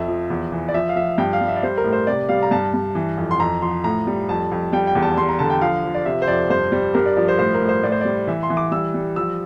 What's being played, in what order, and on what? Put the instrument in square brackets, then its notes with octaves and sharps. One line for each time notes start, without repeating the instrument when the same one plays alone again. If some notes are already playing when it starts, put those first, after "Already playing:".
Already playing: [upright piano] F2 E5
F3
E2
E3
D5
F3 E5
F5
F3 E5
G2 G5
F5
G3
E5
D5
G3 C5
A#4
A2
C5
C3 D5
G3 F5
A#5
G2 A5
G2
E3
F2
C6
F2 A#5
F3 C6
A2 A#5
G3
F2 A5
F2
G3 G5
G5
E2
A5
G3 C6
A#5
D3 A5
G5
F3 F5
F3
D5
C3 E5
C5
F2 D5
G2 C5
G3
G2 A#4
D5
F3 D5
C5
A2 C5
A#4
A2
C5
A2 D5
C5
G3 D5
E3 E5
C6
E3
D6
G3 E6
G3
F3 E6